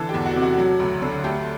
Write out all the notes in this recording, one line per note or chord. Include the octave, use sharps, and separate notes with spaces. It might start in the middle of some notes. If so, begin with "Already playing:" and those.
Already playing: D3 E3 A4
G4
E2
F#4
C3
F#4
F#3
D2
D3
A3 G4